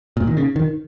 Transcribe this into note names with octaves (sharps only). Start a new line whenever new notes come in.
A#2
D#3
C#3
D#3